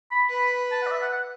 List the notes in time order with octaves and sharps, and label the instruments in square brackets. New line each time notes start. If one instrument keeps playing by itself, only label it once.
[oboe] B5
[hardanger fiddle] B4
[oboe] B5
A5
F#5
D5
E5
F#5
F#5